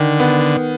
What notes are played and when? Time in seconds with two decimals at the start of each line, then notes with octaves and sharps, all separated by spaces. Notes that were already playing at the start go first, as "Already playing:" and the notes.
Already playing: D3 D#3
0.20 B3